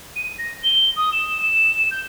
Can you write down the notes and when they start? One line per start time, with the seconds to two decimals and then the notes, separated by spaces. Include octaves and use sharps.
0.15 D#7
0.38 A#6
0.62 G7
0.96 D#6
1.12 E7
1.37 E7
1.90 G6